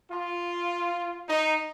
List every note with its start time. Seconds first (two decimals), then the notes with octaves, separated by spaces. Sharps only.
0.11 F4
1.29 D#4